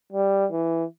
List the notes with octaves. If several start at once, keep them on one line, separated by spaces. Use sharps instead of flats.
G3
E3